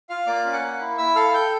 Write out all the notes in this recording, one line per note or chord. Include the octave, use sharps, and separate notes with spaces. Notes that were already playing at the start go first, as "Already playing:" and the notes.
F4 F5 F6
A#3 D5 D6
C#4
F#5 F#6
A#3
E4
E4 E5 E6
A4 F5 F6
A4 G5 G6